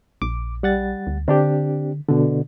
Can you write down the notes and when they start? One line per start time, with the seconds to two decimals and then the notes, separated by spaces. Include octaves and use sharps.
0.22 A#1 D6
0.63 G3 F#5 A6
1.07 D2
1.28 D3 C4 D4 G4
2.09 B2 D3